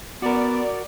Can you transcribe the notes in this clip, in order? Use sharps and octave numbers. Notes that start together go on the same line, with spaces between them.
B3 F#4 A#4 D5